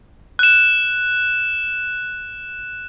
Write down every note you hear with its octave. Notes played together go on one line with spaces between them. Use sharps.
F#6 E7